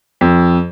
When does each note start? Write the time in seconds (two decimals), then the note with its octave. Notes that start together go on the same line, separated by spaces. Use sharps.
0.21 F2